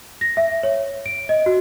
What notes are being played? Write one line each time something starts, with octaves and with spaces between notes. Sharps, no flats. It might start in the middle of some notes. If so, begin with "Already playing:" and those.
A#6
E5
C#5
D7
D#5
F#4